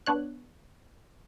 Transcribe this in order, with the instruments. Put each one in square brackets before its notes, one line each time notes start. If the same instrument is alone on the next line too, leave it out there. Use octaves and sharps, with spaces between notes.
[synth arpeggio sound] B3 D4 C#5 F#6